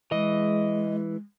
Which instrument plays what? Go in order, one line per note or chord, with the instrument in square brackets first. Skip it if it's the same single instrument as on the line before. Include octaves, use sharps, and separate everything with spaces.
[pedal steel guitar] E3 [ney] G#3 [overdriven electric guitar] D#5